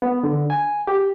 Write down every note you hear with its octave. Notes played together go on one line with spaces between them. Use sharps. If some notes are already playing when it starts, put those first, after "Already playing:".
B3
D3
G#5
G4